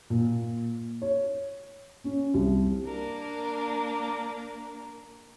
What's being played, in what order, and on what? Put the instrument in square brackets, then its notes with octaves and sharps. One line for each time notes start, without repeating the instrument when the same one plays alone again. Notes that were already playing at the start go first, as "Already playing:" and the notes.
[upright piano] A#2
C#5
C#4
C2
[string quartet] A#3 D4 A#4